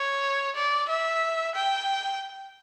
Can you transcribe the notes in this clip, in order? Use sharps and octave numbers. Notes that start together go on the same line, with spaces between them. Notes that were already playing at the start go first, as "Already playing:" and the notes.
Already playing: C#5
D5
E5
G5